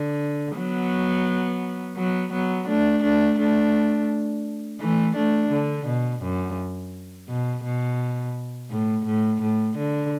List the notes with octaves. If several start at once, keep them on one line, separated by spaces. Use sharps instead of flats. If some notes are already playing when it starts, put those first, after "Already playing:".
Already playing: D3
F#3 B3
F#3 B3
F#3 B3
A3 D4
A3 D4
A3 D4
E3 A3
A3 D4
D3
B2
F#2
B2
B2
A2
A2
A2
D3